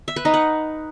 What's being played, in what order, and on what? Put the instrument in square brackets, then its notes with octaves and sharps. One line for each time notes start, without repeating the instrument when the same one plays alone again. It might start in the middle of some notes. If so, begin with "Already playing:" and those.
[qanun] E5
B4
D#4
F#5